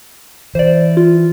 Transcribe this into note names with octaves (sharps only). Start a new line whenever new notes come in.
E3 C5 D5
F4